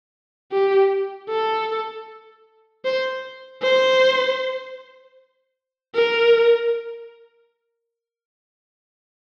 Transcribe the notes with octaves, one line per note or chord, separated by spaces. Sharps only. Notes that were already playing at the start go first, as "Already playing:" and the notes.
G4
A4
C5
C5
A#4